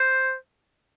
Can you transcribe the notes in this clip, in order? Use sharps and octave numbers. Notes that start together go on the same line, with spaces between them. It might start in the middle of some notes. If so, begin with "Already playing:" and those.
Already playing: C5